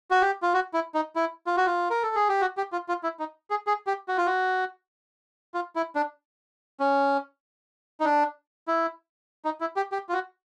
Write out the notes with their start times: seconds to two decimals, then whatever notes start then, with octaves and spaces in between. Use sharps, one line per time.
0.11 F#4
0.22 G4
0.42 F4
0.54 F#4
0.73 E4
0.94 D#4
1.16 E4
1.46 F4
1.57 F#4
1.66 F4
1.90 A#4
2.03 A4
2.15 G#4
2.29 G4
2.41 F#4
2.57 G4
2.72 F4
2.88 F4
3.03 E4
3.19 D#4
3.50 G#4
3.67 G#4
3.87 G4
4.08 F#4
4.18 F4
4.26 F#4
5.54 F4
5.76 E4
5.95 D4
6.80 C#4
8.00 D#4
8.05 D4
8.68 E4
9.45 D#4
9.61 E4
9.76 G4
9.92 G4
10.09 F4
10.13 F#4